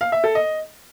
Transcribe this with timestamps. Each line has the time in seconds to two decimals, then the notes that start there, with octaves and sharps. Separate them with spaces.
0.01 F5
0.12 E5
0.24 A4
0.35 D#5